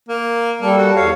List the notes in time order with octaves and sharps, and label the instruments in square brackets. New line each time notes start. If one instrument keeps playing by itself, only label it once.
[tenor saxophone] A#3
[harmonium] G3 A4 [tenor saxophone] A#3
[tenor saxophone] F#4
[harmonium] E2 F5 [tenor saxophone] C#5